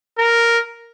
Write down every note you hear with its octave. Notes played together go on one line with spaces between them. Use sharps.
A#4